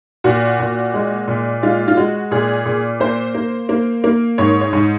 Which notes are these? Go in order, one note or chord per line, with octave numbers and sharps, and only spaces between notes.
A#2 F#4
A#2
G#3
A#2
G#3 F4
F4
G#3 F#4
A#2 G#4
A#2
A#3 C5
A#3
A#3
A#3
G#2 C#5
C#5
G#2